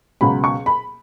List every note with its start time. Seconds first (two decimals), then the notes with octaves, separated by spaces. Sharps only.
0.21 C#2 B2 F#3 C#4 B5
0.44 C#6
0.66 B5